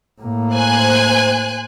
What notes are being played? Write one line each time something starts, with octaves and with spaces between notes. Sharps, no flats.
A2 A#3
C5 G#5 F#6